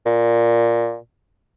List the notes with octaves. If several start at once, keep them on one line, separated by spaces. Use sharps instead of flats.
A#2